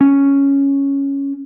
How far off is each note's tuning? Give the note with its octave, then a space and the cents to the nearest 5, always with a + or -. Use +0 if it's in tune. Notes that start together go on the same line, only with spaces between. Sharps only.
C#4 +0